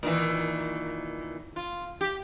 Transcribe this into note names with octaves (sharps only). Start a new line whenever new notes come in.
A#2 D#3 E3
F4
G4